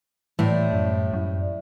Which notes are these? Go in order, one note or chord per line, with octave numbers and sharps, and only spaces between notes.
A2 E3 G3 C4
F#2
F#2